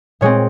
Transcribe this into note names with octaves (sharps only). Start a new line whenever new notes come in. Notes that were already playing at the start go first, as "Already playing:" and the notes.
A#2 G#3 C4 C#5